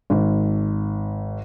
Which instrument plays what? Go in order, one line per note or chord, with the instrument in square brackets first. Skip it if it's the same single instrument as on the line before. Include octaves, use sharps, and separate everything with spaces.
[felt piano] G#1